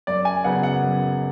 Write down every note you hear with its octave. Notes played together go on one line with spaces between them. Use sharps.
F#2 D5
G#5
C#3 F#3 B3 F#5
F#5
F#2